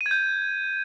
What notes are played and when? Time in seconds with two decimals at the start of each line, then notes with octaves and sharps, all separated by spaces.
0.01 D#7
0.06 G#6
0.11 G6